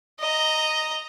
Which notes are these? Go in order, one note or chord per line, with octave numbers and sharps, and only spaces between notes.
D#5 A#5